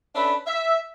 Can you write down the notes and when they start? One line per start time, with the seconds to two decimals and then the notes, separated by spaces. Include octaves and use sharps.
0.15 C#4 D4 A4 B4 E5 B5
0.46 E5